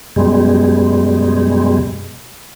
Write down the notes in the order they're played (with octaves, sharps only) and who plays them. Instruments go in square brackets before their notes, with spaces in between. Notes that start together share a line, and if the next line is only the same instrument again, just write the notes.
[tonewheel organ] F#2 B2 G3 G#3